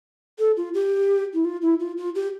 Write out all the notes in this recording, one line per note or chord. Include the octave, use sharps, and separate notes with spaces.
A4
F4
G4
E4
F4
E4
F4
F4
G4